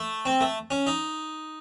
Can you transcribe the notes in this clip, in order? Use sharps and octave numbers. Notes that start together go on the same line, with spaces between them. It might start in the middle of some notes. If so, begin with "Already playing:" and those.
Already playing: A3
C4
A3
C#4
D#4